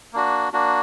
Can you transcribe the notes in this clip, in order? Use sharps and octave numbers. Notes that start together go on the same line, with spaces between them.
A#3 D4 F#4
A#3 D4 F#4